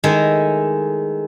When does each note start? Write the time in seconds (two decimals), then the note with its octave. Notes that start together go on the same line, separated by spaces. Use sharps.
0.04 D#3 G#3 A3 E4